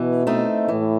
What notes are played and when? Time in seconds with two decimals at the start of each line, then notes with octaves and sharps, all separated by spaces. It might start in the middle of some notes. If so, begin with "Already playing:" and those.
Already playing: B2 E3
0.27 A3 C4 D#4 A4
0.68 A2 E3